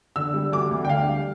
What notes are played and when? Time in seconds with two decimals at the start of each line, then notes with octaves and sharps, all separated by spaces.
0.16 D3 E6
0.34 G3
0.52 D2 D6
0.71 D2
0.85 G5
0.89 D3 F5
1.08 G3